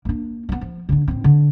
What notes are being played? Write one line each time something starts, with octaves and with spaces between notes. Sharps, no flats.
A#3 D4
A#3 B3
F3
D3 D#4
A1 C4
D3